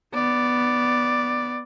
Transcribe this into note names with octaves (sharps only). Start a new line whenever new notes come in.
B3 D5